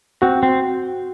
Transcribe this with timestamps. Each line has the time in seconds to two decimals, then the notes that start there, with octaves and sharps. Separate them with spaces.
0.22 C4 F#4
0.43 C4